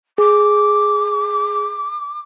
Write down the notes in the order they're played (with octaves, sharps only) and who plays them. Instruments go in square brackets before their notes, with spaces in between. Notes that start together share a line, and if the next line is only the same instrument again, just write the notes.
[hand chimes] G#4 [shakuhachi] D6